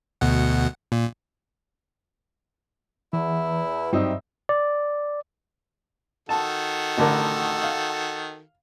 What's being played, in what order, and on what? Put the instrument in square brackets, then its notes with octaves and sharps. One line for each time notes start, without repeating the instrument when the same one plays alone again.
[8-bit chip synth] D2 B2 F#5
A#2
[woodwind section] E2 [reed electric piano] E3 [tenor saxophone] E4
[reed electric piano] G2 D#5 [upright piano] F#3 C4 D#4 [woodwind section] G3 G4 E5
[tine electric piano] D5
[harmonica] D#3 F#4 A4 [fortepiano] A5
[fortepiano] A1 D3 A#4
F5